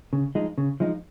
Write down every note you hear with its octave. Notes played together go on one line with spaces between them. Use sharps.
C#3
F3 G#3 D#4
C#3
F3 G#3 D#4